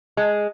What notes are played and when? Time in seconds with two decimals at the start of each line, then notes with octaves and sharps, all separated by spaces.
0.17 G#3